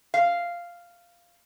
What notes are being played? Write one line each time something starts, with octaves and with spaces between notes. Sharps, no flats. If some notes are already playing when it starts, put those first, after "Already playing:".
F5